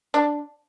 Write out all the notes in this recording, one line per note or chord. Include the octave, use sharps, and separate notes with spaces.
D4